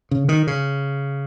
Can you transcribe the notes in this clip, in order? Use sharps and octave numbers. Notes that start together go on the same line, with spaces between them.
C#3
D#3
C#3